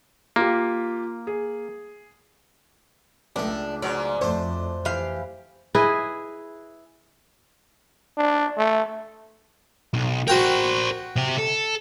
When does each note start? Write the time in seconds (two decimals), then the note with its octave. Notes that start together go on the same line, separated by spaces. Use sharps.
0.36 A#3 F4 G4
1.27 G#4
3.36 C#2 A2 D4 A4
3.82 G#2 F#3 D5
4.21 F2 A3 D4 C5
4.85 E3 G4 F5
5.75 E4 G#4 B4 D#5
8.17 D4
8.57 A3
9.93 B1
10.28 F#4 A#4 C5 G5
11.16 C3 G4
11.38 A4